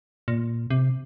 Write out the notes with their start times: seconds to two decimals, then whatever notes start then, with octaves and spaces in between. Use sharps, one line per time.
0.28 A#2
0.70 C3